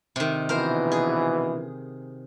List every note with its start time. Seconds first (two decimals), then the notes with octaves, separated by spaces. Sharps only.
0.16 C3 D#3
0.49 A#1 B2 E3 A#4 C5
0.92 G#4